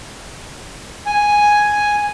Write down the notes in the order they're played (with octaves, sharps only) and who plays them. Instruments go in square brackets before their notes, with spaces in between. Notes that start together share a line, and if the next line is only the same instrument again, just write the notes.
[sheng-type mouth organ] G#5